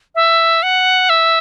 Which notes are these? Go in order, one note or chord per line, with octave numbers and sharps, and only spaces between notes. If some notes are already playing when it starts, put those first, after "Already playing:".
E5
F#5
E5